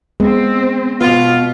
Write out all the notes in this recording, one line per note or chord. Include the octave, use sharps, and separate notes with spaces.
G#3 B3 C4
B2 B3 F4